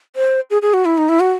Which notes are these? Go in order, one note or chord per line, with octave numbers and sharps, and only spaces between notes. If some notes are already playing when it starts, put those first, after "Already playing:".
C5
G#4
G#4
F#4
E4
D#4
E4
F#4